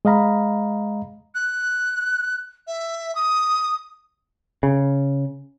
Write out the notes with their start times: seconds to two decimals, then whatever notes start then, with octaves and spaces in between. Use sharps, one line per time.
0.05 G#3 D#5 F5 A#5 B5
1.35 F#6
2.67 E5
3.15 D#6
4.63 C#3